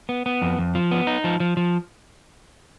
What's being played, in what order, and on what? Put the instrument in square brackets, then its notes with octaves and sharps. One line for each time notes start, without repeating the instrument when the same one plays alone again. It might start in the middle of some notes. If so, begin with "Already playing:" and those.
[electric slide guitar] B3
B3
F2
F2
F3
B3
D#4
F3
F3
F3